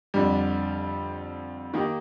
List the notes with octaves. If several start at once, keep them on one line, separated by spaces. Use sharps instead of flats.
F2 D3 G3
D#3 A#3 D#4 G4